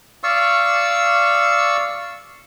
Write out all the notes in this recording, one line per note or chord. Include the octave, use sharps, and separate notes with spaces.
D5 F5 C#6 E6